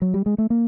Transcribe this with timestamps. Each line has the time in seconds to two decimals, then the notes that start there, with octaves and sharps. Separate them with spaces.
0.02 F#3
0.14 G3
0.26 G#3
0.38 A3
0.50 A#3